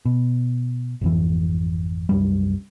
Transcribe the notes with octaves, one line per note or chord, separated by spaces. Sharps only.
B2
G#1 F2 E3
C2 F#2 G3